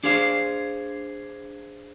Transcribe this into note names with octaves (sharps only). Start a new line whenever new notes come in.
D4 G#4 C5 F5